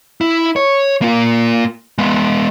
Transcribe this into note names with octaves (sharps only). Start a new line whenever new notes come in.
E4
C#5
A#3 F4
G#3 B3